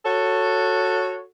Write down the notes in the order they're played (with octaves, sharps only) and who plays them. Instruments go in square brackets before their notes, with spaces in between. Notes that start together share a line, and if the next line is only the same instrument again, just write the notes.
[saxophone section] F#4 A4 C#5